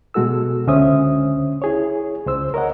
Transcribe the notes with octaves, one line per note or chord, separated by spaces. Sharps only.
B2 G#3 F#4 A4 E6
C#2 D3 C#4 C5 E5 D#6
E4 G#4 C#5
C#2 C5 E6
A#4 C#5 D#5 F#5